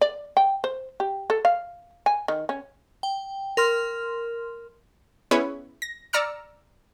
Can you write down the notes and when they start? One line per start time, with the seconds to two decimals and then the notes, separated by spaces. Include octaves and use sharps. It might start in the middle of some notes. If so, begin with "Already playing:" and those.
0.01 D5
0.37 G5
0.64 C5
1.00 G4
1.30 A4
1.45 F5
2.06 G#5
2.28 D#3
2.49 C#4
3.03 G5
3.57 A#4 C6 F6
5.31 B3 C#4 E4 G#4 B4 C#5
5.82 A#6
6.13 D5 A#5 E6 F6 C#7